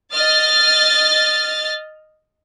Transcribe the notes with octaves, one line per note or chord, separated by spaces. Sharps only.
D#5 F6 A6